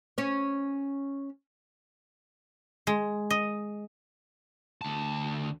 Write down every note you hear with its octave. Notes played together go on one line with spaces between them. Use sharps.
C#4 C#5
G#3
D#5
D2 A5